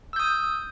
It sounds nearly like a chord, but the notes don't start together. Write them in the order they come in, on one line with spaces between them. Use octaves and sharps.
E6 G6 D#6